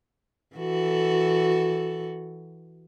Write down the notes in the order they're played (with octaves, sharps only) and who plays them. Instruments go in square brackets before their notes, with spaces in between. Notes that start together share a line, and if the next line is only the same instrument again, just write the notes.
[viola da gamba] E3 F#4 A4